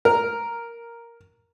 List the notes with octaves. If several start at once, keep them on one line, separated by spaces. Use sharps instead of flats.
A#4